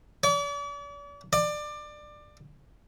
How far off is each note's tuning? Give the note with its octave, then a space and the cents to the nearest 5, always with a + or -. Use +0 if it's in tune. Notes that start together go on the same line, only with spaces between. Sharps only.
D5 -45
D5 +20